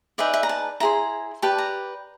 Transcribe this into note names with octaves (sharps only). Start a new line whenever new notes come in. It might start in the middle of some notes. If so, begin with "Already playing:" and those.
D#4 G#4 B4 D5 E5
E5
A#5
A5
E4 G#4 C5 A#5
G4 B4 D5 A5
A#5